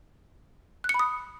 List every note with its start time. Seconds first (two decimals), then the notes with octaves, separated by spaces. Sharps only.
0.84 F#6
0.89 C#7
0.94 B5
0.99 D#6